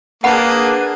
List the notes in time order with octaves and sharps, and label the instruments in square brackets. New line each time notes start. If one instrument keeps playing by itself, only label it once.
[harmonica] A#3 [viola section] D4 G#4 [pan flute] B4 [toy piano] F#5 B5